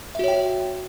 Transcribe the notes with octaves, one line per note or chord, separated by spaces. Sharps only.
F#4 C#5 E5 G5